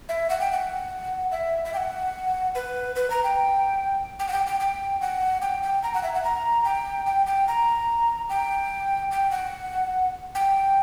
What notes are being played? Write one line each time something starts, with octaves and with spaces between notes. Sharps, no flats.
E5
F#5
G5
F#5
E5
E5
G5
F#5
B4
B4
A#5
G5
G5
F#5
G5
G5
G5
F#5
G5
G5
A#5
F#5
E5
F#5
A#5
G5
G5
G5
A#5
G5
G5
F#5
G5